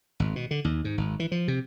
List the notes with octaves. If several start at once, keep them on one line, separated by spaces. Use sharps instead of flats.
G#1
B2
D3
D#2
G#2
G#1
E3
F3
C3